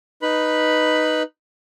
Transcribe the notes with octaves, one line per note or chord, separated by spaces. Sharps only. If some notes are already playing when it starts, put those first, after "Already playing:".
D#4 B4 B5